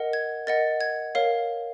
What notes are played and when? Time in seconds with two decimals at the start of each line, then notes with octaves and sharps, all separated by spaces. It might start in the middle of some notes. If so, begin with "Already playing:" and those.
Already playing: A#4 D#5 F#5
0.13 G#6
0.47 A#4 D#5 F#5 A6
0.81 G#6
1.15 A#4 C#5 F5